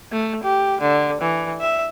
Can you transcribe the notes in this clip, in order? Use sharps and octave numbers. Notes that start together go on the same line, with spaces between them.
A3
G4
D3
E3
E5